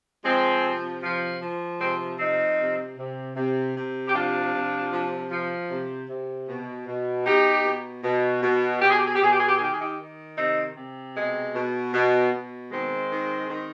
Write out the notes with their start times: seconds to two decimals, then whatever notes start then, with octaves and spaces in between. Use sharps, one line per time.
0.25 F3 G#3 C4
0.64 C3
1.03 F3
1.42 F3
1.80 C3 G#3 C4
2.19 F3 C4 D#4
2.59 C3
2.98 C3
3.36 C3
3.76 C3
4.08 G4
4.14 F3 D4 F4
4.54 C3
4.93 F3
5.31 F3
5.70 C3
6.09 C3
6.49 B2
6.87 B2
7.26 B2 D#4 G4
7.65 B2
8.04 B2
8.43 B2
8.82 B2 G4
8.90 G#4
8.99 G4
9.07 G#4
9.16 G4
9.22 B2 G#4
9.32 G4
9.40 G#4
9.49 G4
9.56 G#4
9.59 D#3 G4
9.73 G#4
9.81 D#4 G4
9.99 D#3
10.38 C3 C4 D#4
10.77 C3
11.16 B2 G#3
11.55 B2
11.94 B2
12.33 B2
12.71 D#3 G#3 C4
13.10 D#3
13.49 D#3